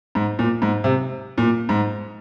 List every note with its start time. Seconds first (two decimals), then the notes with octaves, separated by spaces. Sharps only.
0.15 G#2
0.39 A#2
0.62 G#2
0.84 C3
1.38 A#2
1.69 G#2